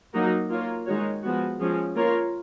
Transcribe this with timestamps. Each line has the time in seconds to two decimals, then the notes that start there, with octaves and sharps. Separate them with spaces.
0.13 F#3 A#3 D#4 F#4 A#4
0.50 A#3 F4 A#4 C#5
0.86 D#3 G#3 D#4 F#4 C#5
1.23 F3 G#3 B3 F#4
1.59 F3 G#3 C#4
1.95 A#3 F4 A#4 C#5